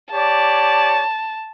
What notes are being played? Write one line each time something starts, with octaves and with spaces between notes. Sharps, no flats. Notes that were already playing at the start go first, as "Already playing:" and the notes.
G4 C#5 D5 A5